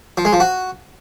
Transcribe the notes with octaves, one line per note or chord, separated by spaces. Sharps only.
F3
G#3
F3
F#4